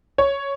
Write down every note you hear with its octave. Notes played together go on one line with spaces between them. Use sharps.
C#5